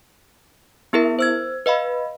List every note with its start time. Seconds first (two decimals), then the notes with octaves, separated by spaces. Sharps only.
0.93 B3 E4 G#4 A#4 E5
1.19 C5 E6 G#6
1.66 B4 D#5 F5 B5